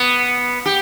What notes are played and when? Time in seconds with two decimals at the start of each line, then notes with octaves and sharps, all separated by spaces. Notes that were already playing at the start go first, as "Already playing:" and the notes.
Already playing: B3
0.66 G4